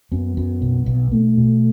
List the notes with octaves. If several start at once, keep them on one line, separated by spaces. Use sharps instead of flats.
F#2 B3
F#2
B1
B1
B1 A3
B2